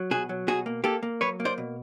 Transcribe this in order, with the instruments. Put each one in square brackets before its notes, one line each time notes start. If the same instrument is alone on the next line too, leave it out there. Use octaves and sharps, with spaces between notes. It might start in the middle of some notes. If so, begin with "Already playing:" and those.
Already playing: [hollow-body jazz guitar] F#3
B2 F#4 G#4
F#3
B2 F#4 G#4
A#3
A#3 G4 A4
A#3
F#3 B4 C#5
A#3
C5 D5
B2